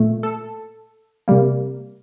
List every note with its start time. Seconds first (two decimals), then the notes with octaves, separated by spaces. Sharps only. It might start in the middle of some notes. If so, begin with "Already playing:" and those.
Already playing: A#2 A3
0.23 A4
1.28 C3 G3 A#3